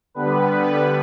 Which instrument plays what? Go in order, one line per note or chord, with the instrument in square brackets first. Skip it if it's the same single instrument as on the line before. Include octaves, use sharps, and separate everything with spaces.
[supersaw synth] D3 G3 B3 B4